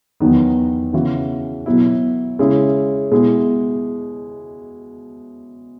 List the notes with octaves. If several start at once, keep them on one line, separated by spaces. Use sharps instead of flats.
E2 D#3 F#3 B3 D#4
C#3 E3 B3 F#4
B2 F#3 B3 E4
C#3 G#3 C#4 E4 G#4
B2 G#3 B3 E4 G#4